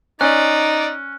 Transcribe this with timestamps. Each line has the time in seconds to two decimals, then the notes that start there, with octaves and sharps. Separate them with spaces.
0.21 C#4 D#4 D5 F#6